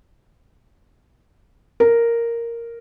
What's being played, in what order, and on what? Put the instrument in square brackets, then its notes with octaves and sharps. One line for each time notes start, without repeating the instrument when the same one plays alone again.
[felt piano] A#4